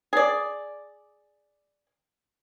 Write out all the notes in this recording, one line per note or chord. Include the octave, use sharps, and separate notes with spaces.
G#4 D5